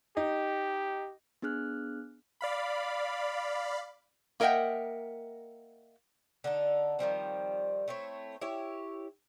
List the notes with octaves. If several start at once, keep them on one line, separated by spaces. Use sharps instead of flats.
D#4 G4
B3 D4 G#4 F6 F#6
D5 F5 B5
A#3 A#4 D#5 E5 F#5 G5
D3 D4 D#4 A4
D#3 F3 G3 C4
A3 C4 E4 C#5
E4 G4 C#5